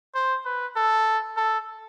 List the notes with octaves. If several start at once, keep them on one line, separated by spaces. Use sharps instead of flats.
C5
B4
A4
A4